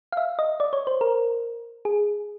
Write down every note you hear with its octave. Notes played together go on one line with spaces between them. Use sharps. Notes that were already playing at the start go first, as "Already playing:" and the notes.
F5
E5
D#5
D5
C#5
C5
A#4
G#4